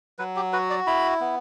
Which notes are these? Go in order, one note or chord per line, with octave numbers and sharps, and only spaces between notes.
F#3 B4
G4
F#4 B4
D5
E4 B5
B3